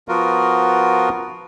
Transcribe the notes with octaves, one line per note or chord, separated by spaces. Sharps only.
F3 B3 F4 F#4 A#4